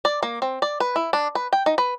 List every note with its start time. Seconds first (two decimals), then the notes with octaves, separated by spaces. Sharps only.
0.05 D5
0.23 A#3
0.42 C4
0.62 D5
0.80 B4
0.96 E4
1.13 D4
1.35 B4
1.53 G5
1.66 D#4
1.78 B4